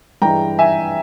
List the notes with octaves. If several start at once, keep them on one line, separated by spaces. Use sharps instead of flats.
G2 E3 G#3 G5 A#5
E5 G#5